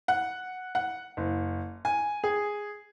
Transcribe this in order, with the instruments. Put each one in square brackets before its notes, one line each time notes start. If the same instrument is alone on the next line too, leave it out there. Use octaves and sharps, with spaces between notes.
[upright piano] F#5
F#5
F#1
G#5
G#4